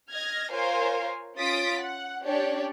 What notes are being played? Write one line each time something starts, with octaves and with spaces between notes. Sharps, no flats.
D#5 F6 G#6 A#6
F4 A#4 C5 C#5 F5 G#5
C#4 F4 D#6 A6 B6 D7
F#5
C#4 D4 G4 C#5 D5